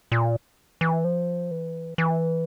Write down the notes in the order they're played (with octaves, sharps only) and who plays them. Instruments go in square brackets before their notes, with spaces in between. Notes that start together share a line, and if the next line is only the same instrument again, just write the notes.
[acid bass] A#2
E3
F3
E3
E3